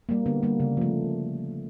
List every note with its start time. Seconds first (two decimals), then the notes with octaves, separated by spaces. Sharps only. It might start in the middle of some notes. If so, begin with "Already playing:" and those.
0.09 G3 A#3
0.26 D3 B3
0.43 G3 A#3
0.60 C#3
0.77 F3 A3